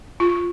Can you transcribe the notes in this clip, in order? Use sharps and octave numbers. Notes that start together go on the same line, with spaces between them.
F4